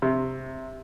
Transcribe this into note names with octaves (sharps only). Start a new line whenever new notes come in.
C3